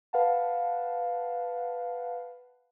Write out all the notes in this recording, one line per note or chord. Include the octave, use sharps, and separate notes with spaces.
B4 F5 F#5 A5